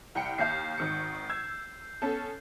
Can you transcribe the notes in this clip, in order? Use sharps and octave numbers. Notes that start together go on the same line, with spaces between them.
C2 G5 C#7
D#2 F5 G6 C7
G#1 D#3 C#7
E6 G#6
B3 C#4 A4